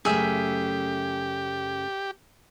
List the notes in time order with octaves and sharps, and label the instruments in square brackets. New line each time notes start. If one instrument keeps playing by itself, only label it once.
[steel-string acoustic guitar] F#2 C#3 A3 [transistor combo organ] G4 [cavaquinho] G#4 E5